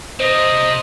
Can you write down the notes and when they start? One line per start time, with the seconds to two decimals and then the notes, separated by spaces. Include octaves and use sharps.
0.20 C3 C5 D#5